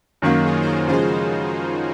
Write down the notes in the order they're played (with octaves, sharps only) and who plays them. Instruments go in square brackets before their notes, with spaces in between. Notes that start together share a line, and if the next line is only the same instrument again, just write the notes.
[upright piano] F#2 D#3 F#3 A#3 [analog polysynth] D#4 F#4
[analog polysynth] F4 G#4
C5
F#4 A#4
[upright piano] C#3 F3 G#3 [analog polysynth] G#4 C5